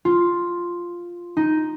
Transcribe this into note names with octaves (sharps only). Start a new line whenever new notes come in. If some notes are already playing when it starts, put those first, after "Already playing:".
F4
D#4